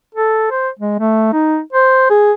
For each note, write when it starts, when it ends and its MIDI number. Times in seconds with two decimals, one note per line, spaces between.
0.15 0.47 69
0.51 0.69 72
0.79 0.96 56
0.99 1.30 57
1.33 1.60 63
1.73 2.06 72
2.10 2.32 68